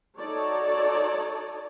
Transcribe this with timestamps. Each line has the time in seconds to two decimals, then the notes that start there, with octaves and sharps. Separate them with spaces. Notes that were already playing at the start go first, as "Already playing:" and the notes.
0.18 D#4 F#4 A4 C#5 D5